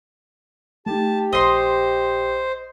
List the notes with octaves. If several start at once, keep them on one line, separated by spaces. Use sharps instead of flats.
A3 D#4 G4 A5
A#1 C5 D#5 C6